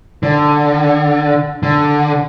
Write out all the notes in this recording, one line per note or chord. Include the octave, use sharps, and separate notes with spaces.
D3
D3